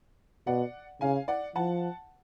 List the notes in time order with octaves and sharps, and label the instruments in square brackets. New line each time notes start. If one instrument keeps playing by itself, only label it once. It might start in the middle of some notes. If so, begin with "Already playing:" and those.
[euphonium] B2 [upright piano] D5 F#5
[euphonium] C#3 [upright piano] F5 G#5
[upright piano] D5 F#5
[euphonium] F3 [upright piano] F#5 A5